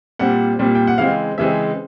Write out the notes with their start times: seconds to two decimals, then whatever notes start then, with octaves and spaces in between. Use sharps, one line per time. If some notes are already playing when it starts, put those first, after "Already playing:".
0.19 A#2 G3 C4 F#5
0.59 A#2 G3 C4
0.75 G5
0.87 F#5
0.98 C#3 E3 G#3 C4 F5
1.38 C#3 E3 G#3 C4 E5